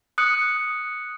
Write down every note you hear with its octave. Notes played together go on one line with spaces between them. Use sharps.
D#6 F#6 C#7